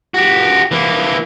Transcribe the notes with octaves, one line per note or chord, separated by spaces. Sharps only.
F#4 G4
E3 A#3